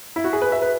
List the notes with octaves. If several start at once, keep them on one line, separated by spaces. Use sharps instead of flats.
E4
F#4
G#4
B4
E5
B4